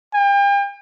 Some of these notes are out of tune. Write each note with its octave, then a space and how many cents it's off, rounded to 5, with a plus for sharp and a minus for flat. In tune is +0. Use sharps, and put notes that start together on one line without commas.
G5 +40